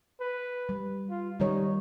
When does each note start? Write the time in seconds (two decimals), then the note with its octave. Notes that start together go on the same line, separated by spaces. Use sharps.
0.20 B4
0.69 G3
1.10 F4
1.40 D#3 G3 D#4 C#5